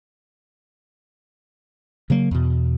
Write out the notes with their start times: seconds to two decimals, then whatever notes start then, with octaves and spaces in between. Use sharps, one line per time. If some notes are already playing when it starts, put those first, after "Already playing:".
2.10 C#3 F#3 A#3
2.31 E2 B2